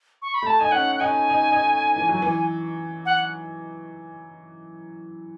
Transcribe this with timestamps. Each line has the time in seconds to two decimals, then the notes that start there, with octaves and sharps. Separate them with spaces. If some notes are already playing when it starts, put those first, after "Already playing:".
0.22 C#6
0.34 B5
0.42 A3 A5
0.60 D#4 G#5
0.72 C#4 F#5
0.96 F#5
1.00 D#4 G#5
1.30 D#4
1.52 D#4
1.96 E3
2.09 F#3
2.22 E3
3.06 F#5